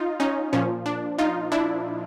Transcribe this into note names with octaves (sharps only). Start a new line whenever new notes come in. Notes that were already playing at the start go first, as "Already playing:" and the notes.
Already playing: D#4 F4
C#4 D#4
A#2 F3 C#4
D4
D#4 F4
D4 E4